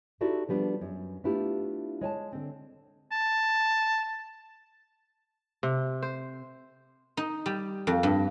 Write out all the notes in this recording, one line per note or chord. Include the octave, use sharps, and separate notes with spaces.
D#4 E4 F#4 G4 A4 D5
F3 G3 B3 D4
F#2
A3 B3 D4 E4 F4 G4
G#3 C#5 G#5 A5
D3 C4
A5
C3
C5
D#4
G3
F2
G2